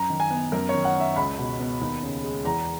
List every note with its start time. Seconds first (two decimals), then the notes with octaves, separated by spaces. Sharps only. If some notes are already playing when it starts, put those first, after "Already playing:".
Already playing: F#2 A#5
0.10 D#3
0.20 G#5
0.31 B3
0.52 F#2 A#4
0.69 C#5
0.74 D#3
0.85 F#5
0.95 C#4
1.00 E5
1.16 C#2 B5
1.38 B2
1.59 B3
1.81 D#2
2.03 C#3
2.24 G#3
2.44 E2 A#5